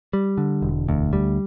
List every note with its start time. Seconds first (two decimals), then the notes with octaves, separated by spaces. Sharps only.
0.13 G3
0.38 D3
0.62 E1
0.89 D2
1.13 G3